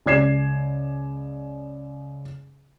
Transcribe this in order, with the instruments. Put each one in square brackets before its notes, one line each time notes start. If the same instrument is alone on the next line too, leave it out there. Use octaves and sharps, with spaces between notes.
[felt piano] C#2 D5 G#6 C7 E7